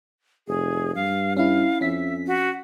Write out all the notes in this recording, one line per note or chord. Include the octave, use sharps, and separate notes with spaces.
F1 G#4
G2 F5
C#4 E4 F5
F2 C#4 E5 B6
F#4